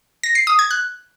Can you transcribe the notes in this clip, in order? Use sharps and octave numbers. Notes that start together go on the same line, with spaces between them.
A#6
C7
D#6
G#6
F#6